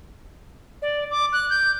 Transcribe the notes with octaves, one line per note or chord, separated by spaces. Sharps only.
D5
D6
F#6
G6